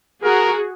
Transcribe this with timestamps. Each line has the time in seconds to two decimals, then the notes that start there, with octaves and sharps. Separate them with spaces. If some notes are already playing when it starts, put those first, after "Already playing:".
0.23 F#4 G#4 A#4